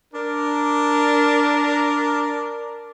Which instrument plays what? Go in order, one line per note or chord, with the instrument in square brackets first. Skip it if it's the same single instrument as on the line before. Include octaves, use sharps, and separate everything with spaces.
[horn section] D4 A#4